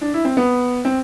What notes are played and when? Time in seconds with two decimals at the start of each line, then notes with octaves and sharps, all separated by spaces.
0.01 D4
0.14 E4
0.25 C4
0.37 B3
0.85 C4